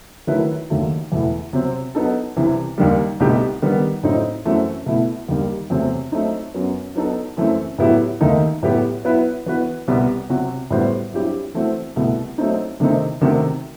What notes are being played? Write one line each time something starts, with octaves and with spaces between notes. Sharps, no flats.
D#3 F#3 A3 E4 B4
D#2 D#3 F#3 A3
E2 B2 A3 E4
C3 F#3 C4
F#3 B3 D#4 A4
C2 C3 E3
D#2 D#3 G3
C2 B2 A3 D#4 G4
D#3 G3 B3
A2 F#3 C4 D#4
F#2 E3 A3 C4 F#4
B2 A3 E4
D#2 D#3 G3
E2 C3 F#3 A3 C4
F#3 A3 C4 D#4
F#2 F#3 B3
F#3 B3 D#4 A4
F#2 E3 A3 C4
A2 F#3 B3 E4 G4
D#2 D#3 A3 D#4
A2 F#3 B3 E4 G4
F#3 B3 E4 B4
E3 B3 F#4 B4
C2 B2 G3 B3
C3 F#3 C4 F#4
A2 G3 B3 F#4 C5
G2 F#3 C4 E4 G4
E3 A3 C4 F#4
C2 B2 A3 E4
F#3 A3 C4 D#4
C3 D#3 A3 C4 D#4
C3 D#3 A3 C4 F#4